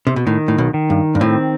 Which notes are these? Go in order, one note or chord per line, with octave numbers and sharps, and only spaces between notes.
C3
B2
A2 D#3
A2
B1 B2
D#3
G2
G2
A2 C4